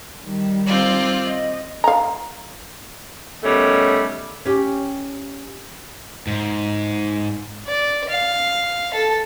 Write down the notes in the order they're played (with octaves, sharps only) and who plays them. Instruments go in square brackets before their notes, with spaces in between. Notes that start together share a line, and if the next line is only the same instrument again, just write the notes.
[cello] D#3 G3
[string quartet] C4 F4 D5
[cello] D#5
[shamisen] F5 A#5
[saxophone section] B2 D#3 G3 A3 C#4
[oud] C#4 G4
[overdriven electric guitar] G#2
[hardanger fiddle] D5
F5
A4